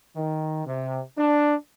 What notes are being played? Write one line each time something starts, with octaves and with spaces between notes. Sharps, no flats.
D#3
C3
D4